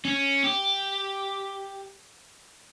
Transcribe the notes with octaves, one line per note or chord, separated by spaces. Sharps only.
C#4
G4